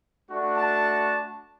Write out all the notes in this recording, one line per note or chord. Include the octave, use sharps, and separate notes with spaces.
A3 D4 F#4
A5